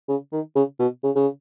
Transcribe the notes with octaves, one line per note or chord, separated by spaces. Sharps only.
C#3
D#3
C#3
B2
C#3
C#3